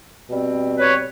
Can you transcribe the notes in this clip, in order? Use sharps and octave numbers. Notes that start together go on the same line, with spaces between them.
B2 G3 C4
B4 C#5